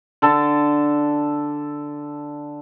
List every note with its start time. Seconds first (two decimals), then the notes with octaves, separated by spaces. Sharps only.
0.22 D3 A4 A5